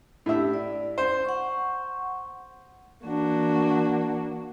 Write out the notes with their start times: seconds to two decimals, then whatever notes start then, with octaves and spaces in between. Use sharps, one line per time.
0.26 A2 D4 G4 E5
0.54 D5
0.98 C5
1.25 F#5 C#6
3.05 E3 A#3 D4 F#4